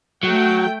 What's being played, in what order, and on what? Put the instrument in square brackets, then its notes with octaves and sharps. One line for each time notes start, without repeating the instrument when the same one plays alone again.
[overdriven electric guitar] F#3 [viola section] A3 G5